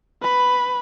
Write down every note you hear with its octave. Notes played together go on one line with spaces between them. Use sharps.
B4 B5